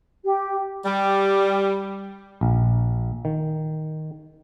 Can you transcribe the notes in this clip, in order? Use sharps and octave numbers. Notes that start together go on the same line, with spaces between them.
G4
G3
A#1
D#3